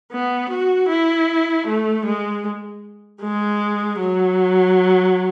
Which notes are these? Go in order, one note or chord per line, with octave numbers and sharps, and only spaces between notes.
B3
F#4
E4
A3
G#3
G#3
F#3